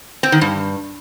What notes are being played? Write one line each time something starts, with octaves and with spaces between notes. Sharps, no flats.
C4
D#3
G2